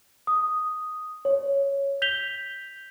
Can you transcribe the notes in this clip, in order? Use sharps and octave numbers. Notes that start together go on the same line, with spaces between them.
D#6
C#5
G6 B6 F7 G7